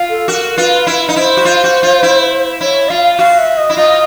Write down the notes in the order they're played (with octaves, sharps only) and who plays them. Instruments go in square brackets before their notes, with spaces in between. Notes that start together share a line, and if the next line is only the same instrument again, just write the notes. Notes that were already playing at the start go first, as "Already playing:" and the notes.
Already playing: [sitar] F4
[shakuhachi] A4
[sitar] F#4 [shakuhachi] A#4
[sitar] F4 [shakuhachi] B4
[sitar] E4
D#4
[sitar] E4 [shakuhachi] C5
[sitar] F#4
F4
F#4
F4
E4
[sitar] E4 [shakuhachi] C#5
[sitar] F4 [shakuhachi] F5
[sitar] F#4 [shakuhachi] F5
[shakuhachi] E5
D#5
[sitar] E4
[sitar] F4 [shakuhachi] D#5